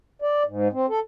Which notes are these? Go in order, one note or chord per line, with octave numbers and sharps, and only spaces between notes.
D5
G#2
C4
A4